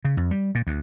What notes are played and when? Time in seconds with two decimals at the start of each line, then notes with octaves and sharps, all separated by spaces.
0.05 C#3
0.17 F2
0.31 G3
0.55 A#2
0.67 D2